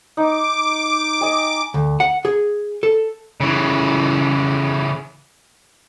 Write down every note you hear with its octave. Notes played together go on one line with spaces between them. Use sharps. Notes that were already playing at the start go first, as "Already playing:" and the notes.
D#4 D6
D#5 G#5
D2
F#5
G#4
A4
C#3 E3